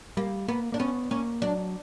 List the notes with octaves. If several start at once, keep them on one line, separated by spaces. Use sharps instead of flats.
G3 A#3
A#3 B3
A#3 D4
B3 C#4
A#3 C#4
F#3 D4